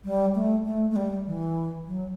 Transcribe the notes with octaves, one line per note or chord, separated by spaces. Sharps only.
G3
A3
A3
A3
G3
E3
F#3